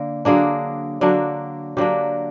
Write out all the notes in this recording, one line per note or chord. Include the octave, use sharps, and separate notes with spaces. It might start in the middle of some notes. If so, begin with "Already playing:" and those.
Already playing: D3 A#3
D3 F#3 A#3 D4 G#4
D3 F#3 A#3 D4
D3 F#3 A#3 D4 G4